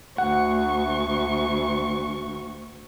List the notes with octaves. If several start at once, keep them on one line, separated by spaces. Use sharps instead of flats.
D2 F#5 C#6